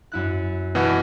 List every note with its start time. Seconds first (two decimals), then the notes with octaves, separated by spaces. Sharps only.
0.12 F#2 E4 F#6
0.75 B2 E3 F#5